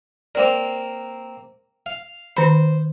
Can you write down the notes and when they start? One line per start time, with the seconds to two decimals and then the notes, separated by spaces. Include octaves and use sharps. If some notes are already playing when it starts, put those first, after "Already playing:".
0.35 A#3 C4 A#4 D5
1.86 F5
2.37 D#3 C5 B5